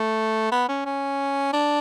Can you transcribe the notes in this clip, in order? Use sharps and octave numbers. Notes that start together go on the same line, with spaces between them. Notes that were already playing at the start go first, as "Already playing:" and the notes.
Already playing: A3
B3
C#4
C#4
D4